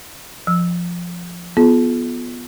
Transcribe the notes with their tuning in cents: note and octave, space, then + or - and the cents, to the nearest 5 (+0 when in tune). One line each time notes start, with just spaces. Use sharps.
F3 +0 E6 -15
B3 +0 F4 +0 G#4 +45